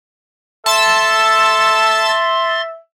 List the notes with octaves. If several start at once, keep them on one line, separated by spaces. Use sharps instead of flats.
A4 E5 A5 C6 E6 A6